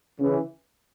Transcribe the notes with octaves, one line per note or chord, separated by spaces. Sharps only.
C#3 E3